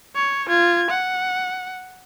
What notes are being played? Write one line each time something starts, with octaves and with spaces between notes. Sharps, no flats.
C#5
F4 G#6
F#5